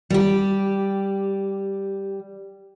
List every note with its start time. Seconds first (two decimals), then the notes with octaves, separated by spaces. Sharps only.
0.10 G3 G4